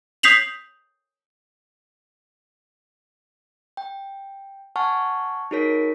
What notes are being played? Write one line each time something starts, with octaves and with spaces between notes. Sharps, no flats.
D#6 G6 B6 C7 F7 F#7
G5
F#5 G#5 A5 C#6 F6
D#4 F#4 G#4 A#4 C#5 B6